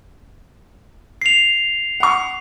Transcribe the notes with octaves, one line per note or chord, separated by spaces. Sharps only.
C7 F7
F#5 C#6